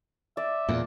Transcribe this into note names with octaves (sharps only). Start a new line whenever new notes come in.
D5 E5
E2 A#2